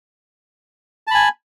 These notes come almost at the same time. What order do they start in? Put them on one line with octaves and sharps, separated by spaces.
A5 B5 G#5